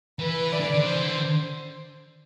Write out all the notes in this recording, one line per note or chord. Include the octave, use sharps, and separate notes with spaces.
E3 B4
E3 D5
D3
D3
E3 C5
D3